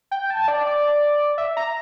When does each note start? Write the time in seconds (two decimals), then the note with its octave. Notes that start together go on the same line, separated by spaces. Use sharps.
0.11 G5
0.30 A5
0.48 D5
0.66 D5
1.38 E5
1.57 A#5